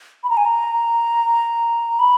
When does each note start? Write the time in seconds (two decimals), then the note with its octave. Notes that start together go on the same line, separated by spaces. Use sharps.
0.24 B5
0.30 A#5
0.37 G#5
0.45 A#5
1.99 B5